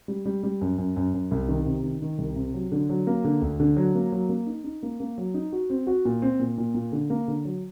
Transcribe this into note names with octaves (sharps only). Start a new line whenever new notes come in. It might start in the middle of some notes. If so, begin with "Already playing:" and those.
G3
G3
G3
F#2
F#2
F#2
F#2
C2
D#3
C3
D#3
D#3
C2
C3
F#3
D3
F#3
A#3
D3
D2
D3
F#3
A#3
F#3
A#3
D#4
D#4
A#3
A#3
F#3
D#4
F#4
C4
F#4
A#2
C4
A#2
A#2
A#2
D3
A#3
D3
F#3